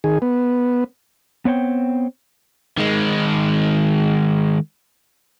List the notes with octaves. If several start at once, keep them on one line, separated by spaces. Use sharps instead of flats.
D#3 G#4
B3
B3 C4 C#5 G5
D#3 G#3